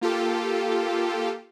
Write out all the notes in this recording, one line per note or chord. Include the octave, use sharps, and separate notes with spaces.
A#3 F4 G4 A4